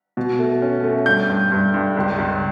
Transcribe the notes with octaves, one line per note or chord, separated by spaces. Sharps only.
B2
A3
C#4
A3
G2 G6
G2
G2
G2
C#2
C#2